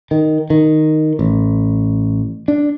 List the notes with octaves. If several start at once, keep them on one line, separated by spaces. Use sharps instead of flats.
D#3
D#3
A1
D4